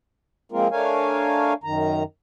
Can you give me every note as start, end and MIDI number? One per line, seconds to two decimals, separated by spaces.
0.52 0.68 53
0.52 0.68 56
0.52 0.68 58
0.52 0.68 60
0.52 0.68 65
0.52 0.68 70
0.71 1.54 57
0.71 1.54 62
0.71 1.54 70
0.71 1.54 73
0.71 1.54 77
0.71 1.54 80
1.64 2.03 42
1.64 2.03 51
1.64 2.03 82